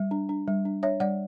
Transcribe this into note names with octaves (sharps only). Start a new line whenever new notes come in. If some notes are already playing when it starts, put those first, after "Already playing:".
Already playing: G3
D4
D4
G3
D4
D4 C#5 E5
G3 D5 F#5